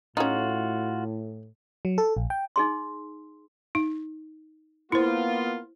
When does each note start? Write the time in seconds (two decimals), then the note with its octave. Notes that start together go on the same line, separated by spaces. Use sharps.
0.17 A2 C#4 D#4 F4 F#4
1.85 F#3
1.98 A4
2.17 A#1
2.30 G5
2.56 D#4 G#4 C6
3.75 D#4
4.92 A#3 B3 E4 F4 C5